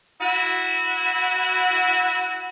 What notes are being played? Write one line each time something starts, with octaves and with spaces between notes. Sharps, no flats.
E4 F#4